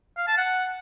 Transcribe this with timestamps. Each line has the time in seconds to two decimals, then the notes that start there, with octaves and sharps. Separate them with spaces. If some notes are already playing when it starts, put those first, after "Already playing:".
0.17 F5
0.27 A5
0.37 F#5